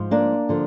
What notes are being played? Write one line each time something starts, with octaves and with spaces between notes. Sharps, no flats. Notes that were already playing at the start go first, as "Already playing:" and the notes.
Already playing: G#2 F3
A#3 D4
D3 F3